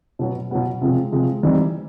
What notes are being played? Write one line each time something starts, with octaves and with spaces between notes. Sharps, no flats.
B2 F#3 B3
B2 F#3 B3
C3 F3 G#3
C3 F3 G#3
E3 G3 C4 D#4